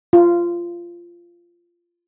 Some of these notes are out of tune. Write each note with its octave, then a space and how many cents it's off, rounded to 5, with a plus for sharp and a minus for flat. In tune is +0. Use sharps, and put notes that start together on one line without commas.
F4 -15